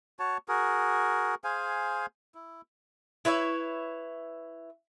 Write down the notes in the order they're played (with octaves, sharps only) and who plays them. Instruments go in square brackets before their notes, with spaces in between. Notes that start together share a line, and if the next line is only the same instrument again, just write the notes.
[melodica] F#4 C#5 A5
F#4 G#4 A#4
G#4 C5 F5 G#5
E4
[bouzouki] E4 B4 C#5 E5